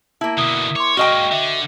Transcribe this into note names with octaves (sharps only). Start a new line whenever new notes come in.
A#3 E4 A5
B2 D3 D#6
C#5 C6 D6
G#3 A#3 F#4 D#5 G5 C#6 F6
D3 E5